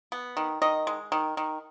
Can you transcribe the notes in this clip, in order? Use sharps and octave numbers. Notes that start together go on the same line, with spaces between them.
B3
D#3
D#3 D#5
G#3
D#3
D#3